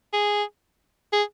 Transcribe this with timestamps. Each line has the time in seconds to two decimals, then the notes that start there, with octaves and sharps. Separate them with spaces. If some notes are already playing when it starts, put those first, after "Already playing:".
0.13 G#4
1.13 G#4